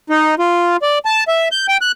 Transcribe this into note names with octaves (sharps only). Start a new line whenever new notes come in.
D#4
F4
D5
A5
E5
G6
G5
F#6